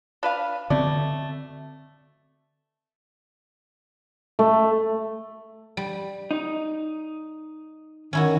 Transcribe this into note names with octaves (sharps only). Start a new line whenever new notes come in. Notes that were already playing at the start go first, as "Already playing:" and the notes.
D4 B4 F5
B2 D3 A3 C4 D5
A3
G3
D#4
D#3 C#4 E4 F#4